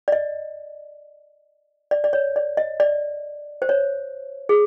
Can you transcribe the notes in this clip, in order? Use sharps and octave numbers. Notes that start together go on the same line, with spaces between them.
D5
D#5
D5
D5
C#5
D5
D#5
D5
C5
C#5
G#4